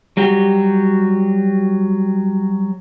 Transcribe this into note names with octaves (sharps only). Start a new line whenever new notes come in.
F#3 G3 F#4 G4